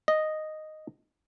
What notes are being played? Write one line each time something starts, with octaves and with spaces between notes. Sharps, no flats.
D#5